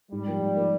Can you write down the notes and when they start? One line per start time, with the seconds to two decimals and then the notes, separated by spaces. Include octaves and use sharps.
0.11 G#2 G3
0.27 F3 A#3
0.41 G#2
0.57 F3 A#3